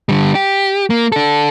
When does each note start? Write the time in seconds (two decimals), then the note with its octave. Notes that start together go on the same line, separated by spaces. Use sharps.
0.09 D3 G3
0.35 G4
0.90 A#3
1.12 D4 A4